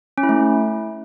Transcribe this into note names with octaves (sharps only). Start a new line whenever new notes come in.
C#4
E4
A3